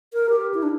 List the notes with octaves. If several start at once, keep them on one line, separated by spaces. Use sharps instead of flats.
A#4
G4
E4
D4